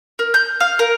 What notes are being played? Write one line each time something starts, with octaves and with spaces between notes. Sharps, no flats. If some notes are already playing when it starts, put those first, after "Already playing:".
A#4
G6
F5
A#4